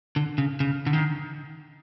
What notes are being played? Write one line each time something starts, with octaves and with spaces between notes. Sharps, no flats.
D3
C#3
C#3
D3
D#3